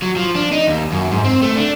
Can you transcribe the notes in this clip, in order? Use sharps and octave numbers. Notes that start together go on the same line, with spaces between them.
F#3
F3
D4
D#4
D#2
F#2
G#2
C4
A3
D4